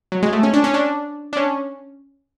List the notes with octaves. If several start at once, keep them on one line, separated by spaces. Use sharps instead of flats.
F#3
G#3
A3
C#4
D4
C#4
D4
D4
C#4